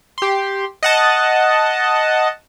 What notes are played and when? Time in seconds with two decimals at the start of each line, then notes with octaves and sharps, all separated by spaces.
0.18 G4 C6
0.83 D#5 F#5 A5